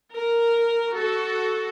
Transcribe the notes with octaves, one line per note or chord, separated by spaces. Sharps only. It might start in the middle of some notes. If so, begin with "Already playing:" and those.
A#4
F#4 A4